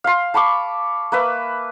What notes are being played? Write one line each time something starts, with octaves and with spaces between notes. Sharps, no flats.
F5 C6
A5 B5 C#6 D6
A#3 B4 E5